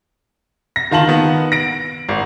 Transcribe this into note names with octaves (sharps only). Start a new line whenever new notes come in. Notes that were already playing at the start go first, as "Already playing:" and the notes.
A#6
D#3 F4 A5 F#7
D#3 B3
A#6 D7
G#1